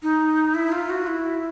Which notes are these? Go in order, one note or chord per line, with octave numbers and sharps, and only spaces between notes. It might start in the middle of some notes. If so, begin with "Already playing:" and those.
D#4
E4
F4
F#4
E4